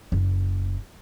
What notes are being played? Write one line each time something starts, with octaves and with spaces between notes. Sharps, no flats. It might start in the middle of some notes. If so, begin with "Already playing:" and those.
F#1